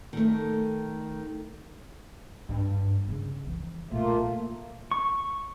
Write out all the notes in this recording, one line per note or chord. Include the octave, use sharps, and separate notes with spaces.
D#3 A3
G2
C#3 C#4
E3 F3
B1 A#2 A3 A#3 F4
C#6